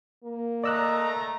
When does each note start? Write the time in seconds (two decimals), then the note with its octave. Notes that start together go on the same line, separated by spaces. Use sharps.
0.24 A#3
0.64 A3 D5 D#5 A#5 E6 F#6